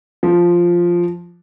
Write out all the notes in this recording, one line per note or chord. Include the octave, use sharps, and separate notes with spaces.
F3